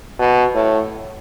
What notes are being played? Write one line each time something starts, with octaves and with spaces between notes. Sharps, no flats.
B2
A2